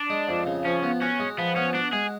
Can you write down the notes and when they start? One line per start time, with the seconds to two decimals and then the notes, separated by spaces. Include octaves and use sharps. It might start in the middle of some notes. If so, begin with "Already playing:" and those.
Already playing: D4
0.10 G#3
0.28 F2
0.46 C#3
0.65 F3 C#4
0.83 B3
1.01 C#4 F#4
1.20 G#3
1.38 F3 B3
1.56 B3 C#4
1.75 D4 F#4
1.92 G#3 G#4